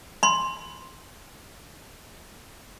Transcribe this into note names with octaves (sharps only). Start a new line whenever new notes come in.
B5 C6